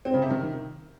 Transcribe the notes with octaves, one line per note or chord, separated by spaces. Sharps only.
C4
C#3
C3
D#3